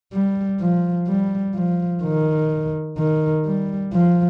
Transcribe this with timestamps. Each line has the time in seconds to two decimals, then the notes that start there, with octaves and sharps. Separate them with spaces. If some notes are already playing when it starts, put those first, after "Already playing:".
0.13 G3
0.60 F3
1.08 G3
1.55 F3
2.03 D#3
2.98 D#3
3.45 G3
3.93 F3